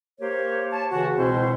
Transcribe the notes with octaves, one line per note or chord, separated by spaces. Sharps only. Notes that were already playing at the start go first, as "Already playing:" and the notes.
A#3 G4 A#4 C5 C#5
C#5 A5
C#3 E3 F#4
C#2 B2 C4 E4 C5